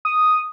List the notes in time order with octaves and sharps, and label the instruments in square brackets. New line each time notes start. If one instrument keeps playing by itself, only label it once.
[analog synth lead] D#6